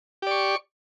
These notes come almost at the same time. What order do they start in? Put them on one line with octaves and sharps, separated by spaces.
G4 D5 C#6